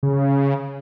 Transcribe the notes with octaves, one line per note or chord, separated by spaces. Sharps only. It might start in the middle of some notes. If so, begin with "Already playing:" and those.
C#3